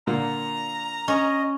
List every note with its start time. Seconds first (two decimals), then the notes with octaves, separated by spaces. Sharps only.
0.07 A#2 D3 A#3 A#5
1.08 C#4 D#5